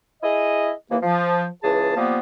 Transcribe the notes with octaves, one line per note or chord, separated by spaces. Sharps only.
E4 G#4 D#5
D#2 E3 A#3
F3
C#2 E3 G#4 A5
F3 G3 A#3 B3